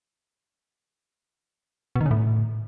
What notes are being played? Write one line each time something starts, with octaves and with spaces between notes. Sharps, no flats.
B2
D#3
C#3
A2